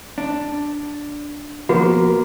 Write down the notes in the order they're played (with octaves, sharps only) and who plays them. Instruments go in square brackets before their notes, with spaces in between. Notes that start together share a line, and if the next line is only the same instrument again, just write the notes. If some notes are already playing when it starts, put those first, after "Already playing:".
[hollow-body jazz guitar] D4
[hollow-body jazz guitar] B2 F3 B3 [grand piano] A#3 [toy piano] F#4